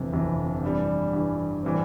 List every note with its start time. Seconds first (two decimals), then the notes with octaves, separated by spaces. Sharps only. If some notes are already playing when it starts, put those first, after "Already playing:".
Already playing: G1 F2 C3 E3
0.12 G1 F2 C3 E3
0.63 G2 E3 G3
1.13 G2 E3 G3
1.63 A2 E3 G3 C4